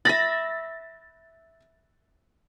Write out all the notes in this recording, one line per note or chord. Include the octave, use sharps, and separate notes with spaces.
E5 B5 A6 A#6